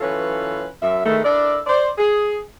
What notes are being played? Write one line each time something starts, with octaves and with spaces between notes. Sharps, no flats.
E3 F#3 C#4 F4 A4 B4
F#2 E5
D#3 E3 G#3 A3
D4 E4 A4 A#4 D5
C5 D5
G#4